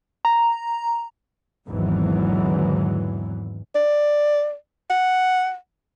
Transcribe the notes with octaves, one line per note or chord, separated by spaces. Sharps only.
A#5
G#1 E2 G#2 D3 E3 F#3
D5
F#5